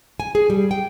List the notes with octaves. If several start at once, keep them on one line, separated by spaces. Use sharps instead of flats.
G#5
G#4
G3
G5